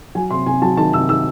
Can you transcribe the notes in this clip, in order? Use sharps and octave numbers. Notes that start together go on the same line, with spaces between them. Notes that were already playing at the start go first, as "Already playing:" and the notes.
F#3 G#5
C3 C6
C3 G#5
F#3 A5
D#3 A5
C3 E6
D#3 E6